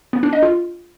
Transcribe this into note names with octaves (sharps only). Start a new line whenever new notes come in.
B3
D4
D#5
F4